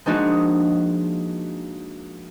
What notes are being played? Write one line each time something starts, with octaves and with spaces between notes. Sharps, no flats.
F3 G#3 A#3 D4 D#4 F#4